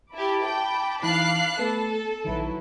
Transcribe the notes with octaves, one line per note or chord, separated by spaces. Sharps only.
E4 G4 A5 B5 D6
G5
E3 D#4 E4 F5 F#6 C7
A3 B3 A4 B4
A#1 D#3 F#3 E4 B4